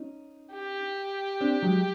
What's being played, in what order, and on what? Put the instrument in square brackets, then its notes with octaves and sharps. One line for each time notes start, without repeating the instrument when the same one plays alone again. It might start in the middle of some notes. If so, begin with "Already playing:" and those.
Already playing: [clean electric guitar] C#4 D#4
[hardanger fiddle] G4
[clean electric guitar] C4 D4
F#3 G#3